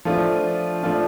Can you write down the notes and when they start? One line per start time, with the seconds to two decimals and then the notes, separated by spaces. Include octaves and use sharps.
0.05 F3 A3 D4 F4
0.83 F3 A3 D4 F4